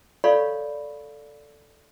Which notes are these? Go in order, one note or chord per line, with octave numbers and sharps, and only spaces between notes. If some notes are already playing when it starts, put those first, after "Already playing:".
A4 C#5 D5 F5 B5 C#6